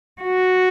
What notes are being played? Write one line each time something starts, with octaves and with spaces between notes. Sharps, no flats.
F#4